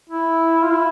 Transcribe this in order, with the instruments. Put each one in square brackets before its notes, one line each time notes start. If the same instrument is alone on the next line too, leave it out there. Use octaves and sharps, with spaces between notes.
[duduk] E4
F4
E4